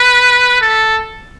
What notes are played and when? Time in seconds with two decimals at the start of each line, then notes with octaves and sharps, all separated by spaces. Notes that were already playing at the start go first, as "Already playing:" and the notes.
Already playing: B4
0.62 A4